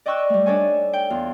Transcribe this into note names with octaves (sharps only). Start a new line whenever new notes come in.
D5 D#5 G5 C#6 E6 F#6
G3 A3
D4 D#4 A4 C#5 G#5
G5
E2 F4